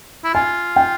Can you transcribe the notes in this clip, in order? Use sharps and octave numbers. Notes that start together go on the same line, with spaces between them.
E4
F4 G#5
G5